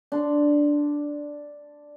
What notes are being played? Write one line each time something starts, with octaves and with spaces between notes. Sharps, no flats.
D4 C6